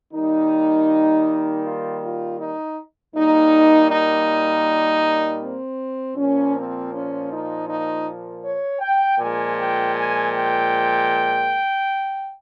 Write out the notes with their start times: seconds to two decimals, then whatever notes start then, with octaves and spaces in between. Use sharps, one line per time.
0.13 D#3 G3 A#3 D#4
1.64 F4
2.02 F4
2.39 D#4
3.15 A#2 G3 A#3 D#4
3.90 D#4
5.41 C4
6.17 A#2 F3 A#3 C#4
6.54 C4
6.92 C#4
7.30 D#4
7.67 D#4
8.43 C#5
8.80 G5
9.18 A#2 F3 G#3 G#5
9.56 G5
9.94 G#5
10.32 G5